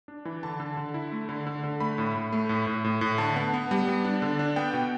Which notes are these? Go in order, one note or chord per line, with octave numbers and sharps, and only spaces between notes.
D4
E3
D3 A5
D3
D3
E4
A3
D3
D3
D3
A3 B5
A2
A2
A3
A2
A2
A2
A2
D3 A5
B3
B3
G3
B3
D4
D3
D4
B3 G5
B2